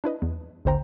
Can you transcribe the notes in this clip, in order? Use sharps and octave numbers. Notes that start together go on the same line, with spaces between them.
D4 E4 B4 D#5
E2
A1 D#2 D3 C5 G5 A#5